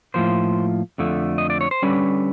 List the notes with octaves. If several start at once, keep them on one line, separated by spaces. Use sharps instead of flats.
A2 F3 A#3 C5
F2 D3 F3 A3
D#5
D5
C#5
C5
D3 G3 C#4 B4